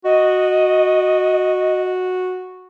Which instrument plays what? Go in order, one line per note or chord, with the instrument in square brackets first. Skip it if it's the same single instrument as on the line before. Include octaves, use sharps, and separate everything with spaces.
[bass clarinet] F#4 [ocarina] D#5